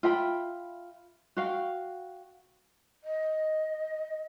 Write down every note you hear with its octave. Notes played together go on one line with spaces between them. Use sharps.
F4 E5 G5 B5
F#4 F5 G5
D#5